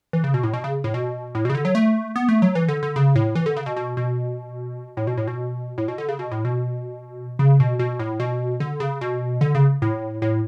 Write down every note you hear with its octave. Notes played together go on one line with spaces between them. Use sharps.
E3
C#3
B2
A2
B2
C#3
A2
B2
A2
B2
C#3
D3
F#3
A3
B3
A3
F#3
E3
D3
D3
C#3
A2
E3
D3
C#3
B2
B2
B2
A2
B2
A2
B2
A2
B2
D3
C#3
B2
A2
B2
C#3
B2
B2
A2
B2
D3
C#3
B2
D3
C#3
A2
A2